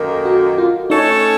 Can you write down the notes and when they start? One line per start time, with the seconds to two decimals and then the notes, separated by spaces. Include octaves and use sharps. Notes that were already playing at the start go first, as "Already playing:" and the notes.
Already playing: F#2 D#3 A#3 A4 A#4
0.25 F#4
0.58 F4
0.90 A3 C#4 D#4 A4 C#5